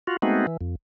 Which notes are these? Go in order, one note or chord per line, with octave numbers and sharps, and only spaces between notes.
F4 F#4
G#3 A3 B3 C4 D#4 F#4
E3
F2